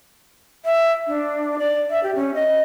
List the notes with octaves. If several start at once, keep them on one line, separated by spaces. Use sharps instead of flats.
E5
D4
D5
E5
G4
C#4
D#5